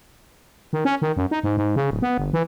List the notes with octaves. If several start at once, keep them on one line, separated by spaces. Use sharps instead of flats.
D#3
C#4
D#3
F#2
D#4
G#2
G#2
C#3
D1
B3
G1
E3